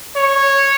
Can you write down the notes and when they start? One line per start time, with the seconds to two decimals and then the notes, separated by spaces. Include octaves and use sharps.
0.16 C#5